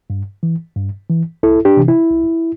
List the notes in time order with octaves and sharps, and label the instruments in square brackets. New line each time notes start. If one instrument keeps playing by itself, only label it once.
[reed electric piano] G2
E3
G2
E3
C2 E4 A4
D4 G4
C3 E3
E4
C2